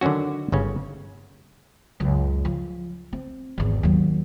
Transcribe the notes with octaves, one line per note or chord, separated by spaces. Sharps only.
D3 D#3 F#3 C#4 F#4
G1 C#3 C#4
C#2 F#2
F3
C4
G#1 E2
D#2 F#3